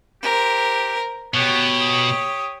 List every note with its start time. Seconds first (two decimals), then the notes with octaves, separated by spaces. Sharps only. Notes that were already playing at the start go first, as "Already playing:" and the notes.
0.23 G4 A#4 C5
1.34 B2 B3 G4 C#5
1.81 D#6